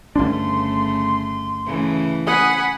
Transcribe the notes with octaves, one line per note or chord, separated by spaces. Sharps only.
G1 C#3 A3 C#4 D4 C6
C#3 E3 A3
F#5 G#5 B5 D#6